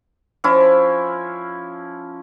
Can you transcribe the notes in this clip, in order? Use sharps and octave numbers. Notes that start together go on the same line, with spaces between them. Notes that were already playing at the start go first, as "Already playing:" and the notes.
F3 C#4 E4